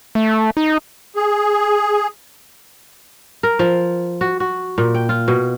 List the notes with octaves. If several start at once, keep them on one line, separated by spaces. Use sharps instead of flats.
A3
D#4
G#4
A#4
F3
F#4
F#4
A#2
G5
F4
B2